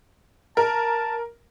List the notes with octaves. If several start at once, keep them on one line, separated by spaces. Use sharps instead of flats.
A#4 A5